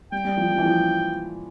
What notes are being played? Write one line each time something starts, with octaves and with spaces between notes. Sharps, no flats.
G3 G5
G3
F3
F3
E3
F3